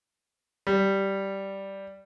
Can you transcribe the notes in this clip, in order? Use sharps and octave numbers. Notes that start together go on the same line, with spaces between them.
G3